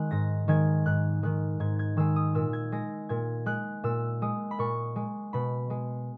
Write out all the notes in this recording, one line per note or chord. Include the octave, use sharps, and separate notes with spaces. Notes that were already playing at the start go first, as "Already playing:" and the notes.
Already playing: D#3 G#3 F#6
G#2 A#6
D#3 G#3 G#6
G#2 F#6
D#3 G#3 F#6
G#2 G#6
G#6
D#3 G#3 E6
D#6
A#2 E6
G#6
G#3 A#6
A#2 G#6
G#3 F#6
A#2 E6
G#3 D#6
B5
A#2 C#6
G#3
B2 B5
G#3